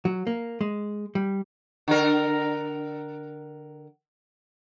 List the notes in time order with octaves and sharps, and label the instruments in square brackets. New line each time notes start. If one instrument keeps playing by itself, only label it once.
[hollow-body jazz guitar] F#3
A#3
G#3
G3
[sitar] D3 A#4